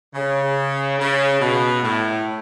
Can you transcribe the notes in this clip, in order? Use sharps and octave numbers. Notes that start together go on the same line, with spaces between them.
C#3
C#3
B2
A2